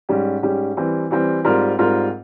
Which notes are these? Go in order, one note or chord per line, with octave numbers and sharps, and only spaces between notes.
G#2 G3 C#4 G4
G#2 G3 C#4 G4
E3 G3 C4
E3 G3 C4
G#2 G3 C4 F4 A#4
G#2 G3 C4 F4 A#4